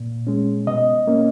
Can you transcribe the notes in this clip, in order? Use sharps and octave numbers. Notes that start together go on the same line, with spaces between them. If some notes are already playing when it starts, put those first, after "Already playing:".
Already playing: A#2
G#3 C#4
B2 D#5
A#3 C#4